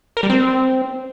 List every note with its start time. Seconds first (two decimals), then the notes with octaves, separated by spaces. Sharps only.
0.17 A#4
0.23 G3
0.30 C4